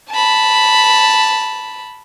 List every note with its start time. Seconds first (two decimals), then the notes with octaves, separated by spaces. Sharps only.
0.10 A5 B5